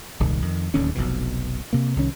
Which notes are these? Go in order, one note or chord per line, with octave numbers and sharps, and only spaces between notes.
D#1 C2 G#2 D#3
F2 D#3
D1 D#2 D3 C#4
F1 B1 F2 B2
C3 A#3
C2 D#3 C#4